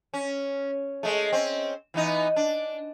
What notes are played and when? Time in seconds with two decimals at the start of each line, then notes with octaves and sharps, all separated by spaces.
0.14 C#4
1.03 G#3 A3
1.33 C4 C#4
1.94 E3 B3 D#4
2.36 D4